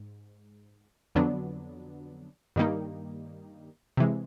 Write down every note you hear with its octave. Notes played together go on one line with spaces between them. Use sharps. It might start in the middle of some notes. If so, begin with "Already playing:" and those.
Already playing: G#2
F2 D3 F#3 B3 D4
G2 D#3 G3 A#3 D#4
C3 E3 G#3